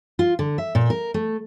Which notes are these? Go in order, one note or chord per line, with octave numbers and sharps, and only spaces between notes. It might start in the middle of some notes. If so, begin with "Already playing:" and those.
F4
D3
E5
A#2
A#4
A3